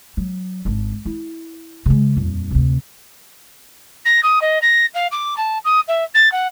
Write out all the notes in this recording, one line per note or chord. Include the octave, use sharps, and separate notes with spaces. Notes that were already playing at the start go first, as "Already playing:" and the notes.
F#3
G#1 D4
E4
C#3 G#3
D#1 F2
D2 C3
A#6
D#6
D#5
A#6
F5
D6
A5
D#6
E5
A6
F#5